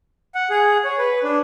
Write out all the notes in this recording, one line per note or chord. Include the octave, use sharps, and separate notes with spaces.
F#5
G#4
C#5
B4
D4